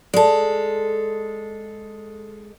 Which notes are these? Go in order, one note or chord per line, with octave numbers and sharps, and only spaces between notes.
G#3 A4 D5 A5